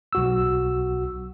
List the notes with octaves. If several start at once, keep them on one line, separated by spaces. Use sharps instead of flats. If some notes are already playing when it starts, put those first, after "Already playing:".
B1 F#4 E6